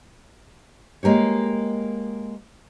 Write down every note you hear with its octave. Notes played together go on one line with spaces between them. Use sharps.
G#3 A#3 G4 C#5